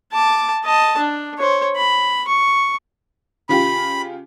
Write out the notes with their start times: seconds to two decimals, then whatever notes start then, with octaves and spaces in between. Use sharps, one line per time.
0.13 A5 D6
0.65 D#5 A5
0.98 D4
1.38 C5 C#5
1.76 B5
2.27 C#6
3.49 C#3 F4 G4 B5